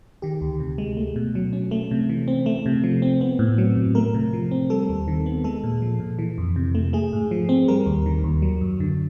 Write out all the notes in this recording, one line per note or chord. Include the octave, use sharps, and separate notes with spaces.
D#3 G4
D2
C3
G#3
A3
B2
F#3
C#4
A3
C3
E3
C4
A3
C3
F3
C4
B3
A2
F#3
A2
A3 A#4
C3
F3
C4
G3 A4
D#2
D#3
B3
G#3 A4
A#2
F3
A#2
E3
F2
C3
A3
A3 G#4
G#2
F3
C4
G3 A#4
D#2
D#3
D#2
F#3
F#2
D3